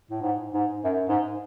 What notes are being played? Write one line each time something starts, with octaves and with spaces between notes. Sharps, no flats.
A2
G#2
G#2
F#2
G#2